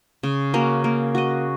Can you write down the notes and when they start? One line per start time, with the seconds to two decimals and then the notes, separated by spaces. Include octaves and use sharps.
0.23 C#3
0.54 A#3 C#4 F#4
0.84 A#3
1.15 F#4 D#5